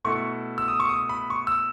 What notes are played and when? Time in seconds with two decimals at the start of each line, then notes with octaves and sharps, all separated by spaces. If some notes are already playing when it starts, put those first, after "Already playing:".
0.05 B2 A3 E4 C#6
0.58 E6
0.68 D#6
0.80 C#6
0.89 D#6
1.09 B5
1.30 C#6
1.47 E6